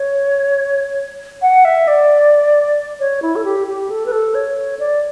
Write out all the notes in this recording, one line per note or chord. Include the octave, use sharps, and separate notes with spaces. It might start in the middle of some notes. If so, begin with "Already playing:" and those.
Already playing: C#5
F#5
E5
D5
C#5
E4
A4
G4
G4
A4
B4
A4
C#5
D5